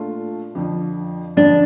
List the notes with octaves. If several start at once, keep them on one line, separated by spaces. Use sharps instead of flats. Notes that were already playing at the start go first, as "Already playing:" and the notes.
Already playing: A#2 A3 D4 F4
F2 D3 F3
F2 D3 F3 D4